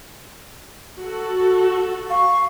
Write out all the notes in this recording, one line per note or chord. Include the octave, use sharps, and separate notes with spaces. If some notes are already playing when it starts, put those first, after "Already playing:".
F#4 A4
F5 C#6